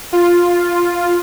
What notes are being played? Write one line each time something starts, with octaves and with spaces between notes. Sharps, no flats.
F4